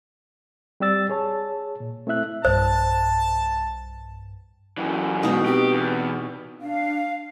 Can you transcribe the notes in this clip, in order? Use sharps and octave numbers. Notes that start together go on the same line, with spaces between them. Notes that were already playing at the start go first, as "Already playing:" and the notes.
G3 C4 G4 D5 E6 A6
G#4 C#5 A5
A#2
A3 C4 E4 E5 F#6
B1 G2 C5 A5
F#2 E3
B2 G#3 D#4
C4 G4
E2
D4 F5